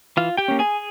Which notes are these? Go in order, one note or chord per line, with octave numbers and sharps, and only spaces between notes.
E3 F4 F5
G4 G5
A#3 C#4
G#4 G#5